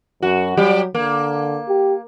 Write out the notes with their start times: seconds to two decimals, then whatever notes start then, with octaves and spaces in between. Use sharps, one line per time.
0.22 F#2 F#4
0.57 F#3 G3 G4
0.95 D3 A#3
1.68 G4